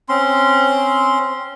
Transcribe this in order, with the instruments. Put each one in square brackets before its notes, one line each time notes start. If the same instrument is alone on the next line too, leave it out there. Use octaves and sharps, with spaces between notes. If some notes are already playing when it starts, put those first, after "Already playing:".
[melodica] C4 C#4 C6